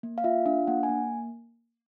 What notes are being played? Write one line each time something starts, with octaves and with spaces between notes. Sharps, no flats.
A#3
F5
F4 E5
D4 F5
A#3 F#5
G#5
A#3